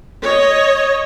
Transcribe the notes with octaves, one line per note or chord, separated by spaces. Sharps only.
C#5 D#5